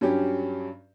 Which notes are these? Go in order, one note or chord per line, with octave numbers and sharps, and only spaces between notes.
G2 F#3 C#4 G4